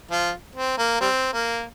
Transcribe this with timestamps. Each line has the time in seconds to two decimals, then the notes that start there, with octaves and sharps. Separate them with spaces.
0.10 F3 F4
0.56 C4
0.78 A#3
1.01 G3 C4
1.33 A#3